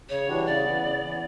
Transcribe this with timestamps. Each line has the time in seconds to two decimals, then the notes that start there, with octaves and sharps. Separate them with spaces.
0.09 C#3 C#5
0.27 E3 G3 D4 F#4
0.46 C#3 D5
0.64 E3 B3
0.83 C#3
1.01 E3 B3